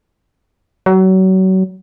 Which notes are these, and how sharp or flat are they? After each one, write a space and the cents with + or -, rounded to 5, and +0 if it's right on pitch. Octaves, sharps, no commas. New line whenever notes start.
F#3 +30